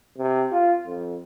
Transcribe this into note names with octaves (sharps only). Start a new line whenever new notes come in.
C3
F4
F2